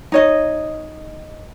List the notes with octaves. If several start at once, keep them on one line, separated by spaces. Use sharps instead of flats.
D#4 C#5 D#5